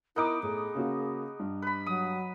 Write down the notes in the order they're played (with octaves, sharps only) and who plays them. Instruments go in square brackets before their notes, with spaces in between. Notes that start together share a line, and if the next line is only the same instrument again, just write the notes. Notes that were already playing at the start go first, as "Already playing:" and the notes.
[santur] B3 D#4 D6 [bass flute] E4 [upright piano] A#4 D#6
[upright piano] A2 [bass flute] G#4
[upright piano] C#3 A#3 F#4
G2
[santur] B4 B5
[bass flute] F#3 [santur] D#6